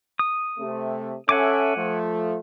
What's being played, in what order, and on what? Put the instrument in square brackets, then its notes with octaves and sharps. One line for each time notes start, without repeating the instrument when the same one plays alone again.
[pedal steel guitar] D#6
[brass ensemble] C3 A3
[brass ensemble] C#4 A4 E5 [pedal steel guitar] F#5 G#5 D6
[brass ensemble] F3 A3